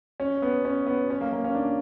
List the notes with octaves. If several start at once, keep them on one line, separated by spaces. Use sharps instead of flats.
C#4
B3
C#4
B3
C#4
A#3
A#3
C#4
D4